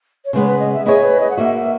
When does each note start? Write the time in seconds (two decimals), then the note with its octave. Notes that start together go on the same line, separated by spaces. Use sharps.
0.25 C#5
0.33 C#3 G#3 B3 B4
0.47 B4
0.59 D#5
0.73 E5
0.85 B3 E4 G#4 C#5 D#5
1.02 B4
1.20 D#5
1.30 F#5
1.37 A#3 D#4 F#4 E5
1.55 E5